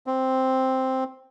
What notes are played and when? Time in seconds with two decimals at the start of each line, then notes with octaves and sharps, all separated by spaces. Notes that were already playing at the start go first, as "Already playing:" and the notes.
0.07 C4